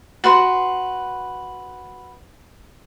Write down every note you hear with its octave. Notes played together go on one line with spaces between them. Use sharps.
F#4 B4 C6